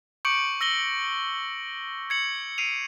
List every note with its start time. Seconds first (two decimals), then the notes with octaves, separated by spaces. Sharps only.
0.25 C#6 D6 G6 C#7 D7 F#7
0.61 E6 A#6 F#7 G7
2.10 G#6 C#7 F#7
2.58 E6 C7 D7 D#7 F7